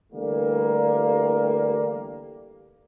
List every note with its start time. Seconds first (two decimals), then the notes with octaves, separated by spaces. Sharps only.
0.12 D3 E3 G3 A3 A#3